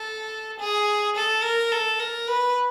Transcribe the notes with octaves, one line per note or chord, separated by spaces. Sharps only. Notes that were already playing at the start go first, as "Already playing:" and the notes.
Already playing: A4
G#4
A4
A#4
A4
A#4
B4